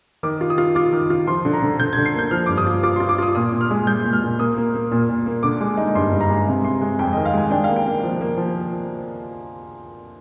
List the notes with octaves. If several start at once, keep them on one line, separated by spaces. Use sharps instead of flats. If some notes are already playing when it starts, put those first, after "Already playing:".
D#3 D6
F4
D#6
F4
F4 D6
D#3
F4
F3 C6
D3
A#5
D3
D3 G6
D3 G#6
C7
A#3 G6
F3 F6
G2 D6
D#6
F4
F4 D6
F4 C6
D6
F4 D#6
A#2 D#6
A#2
F6
G#3
G#3 G6
A#2
F6
A#2
A#3 D#6
A#3
A#3
A#2
A#2
A#3
D3 D6
G#3
D#4
G2 C6
G2
A#5
G#3
C3
C3 C6
G#3
F2 G5
D#3 D#5
F5
G#3 G#5
D4 G5
A#3 F5
G5
A#3
F3
A#3
F3